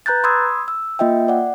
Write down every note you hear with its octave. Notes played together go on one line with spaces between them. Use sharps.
B4 A#5 F#6 G6 A6
B5 C6 D#6 E6 G#6
E6
A#3 F4 D#5 E5 G5
D5 F#5